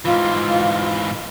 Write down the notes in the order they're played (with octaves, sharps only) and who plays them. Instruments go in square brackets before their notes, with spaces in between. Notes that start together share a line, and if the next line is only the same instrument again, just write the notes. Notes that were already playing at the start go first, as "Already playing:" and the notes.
[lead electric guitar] G#2 E3 [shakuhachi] F4